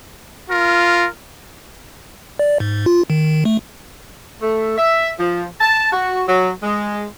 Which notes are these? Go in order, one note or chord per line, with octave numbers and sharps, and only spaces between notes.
F4 A#4
D5
G#2
F4
D#3
A3
A3
E5
F3
A5
F#4
F#3
G#3